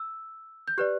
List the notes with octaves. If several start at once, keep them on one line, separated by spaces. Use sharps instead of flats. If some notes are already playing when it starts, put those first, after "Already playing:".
Already playing: E6
G6
G4 B4 D5 F#6